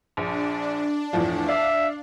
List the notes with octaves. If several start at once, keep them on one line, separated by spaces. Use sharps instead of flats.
A#1 D4
E2 A2 F3
D5 E5 F5